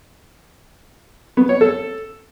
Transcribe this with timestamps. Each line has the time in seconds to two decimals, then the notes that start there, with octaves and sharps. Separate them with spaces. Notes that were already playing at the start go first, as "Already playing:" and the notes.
1.37 B3
1.49 C#5
1.61 A4